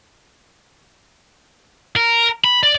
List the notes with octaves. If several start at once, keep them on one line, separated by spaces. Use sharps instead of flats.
A#4
B5
D5